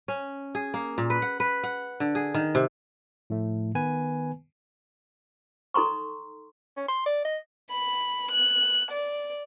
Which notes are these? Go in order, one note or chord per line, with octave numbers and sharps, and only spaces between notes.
C#4
G#4
A#3
A#2
B4
F#5
B4
F#5
D3
G#4
D#3
C3
A2 F3 A3
D#3 B3 B4 G#5
D#4 A4 A#5 C6 C#6
C#4
C6
D5
D#5
B5
F#6
D5